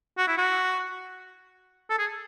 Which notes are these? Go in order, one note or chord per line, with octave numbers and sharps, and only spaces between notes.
F#4
E4
F#4
A4
G#4